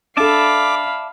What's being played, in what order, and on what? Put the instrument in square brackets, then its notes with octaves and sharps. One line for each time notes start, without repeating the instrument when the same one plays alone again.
[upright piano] D4 A4 [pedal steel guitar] D5 E5 A5 [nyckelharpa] F5 B5 [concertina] D6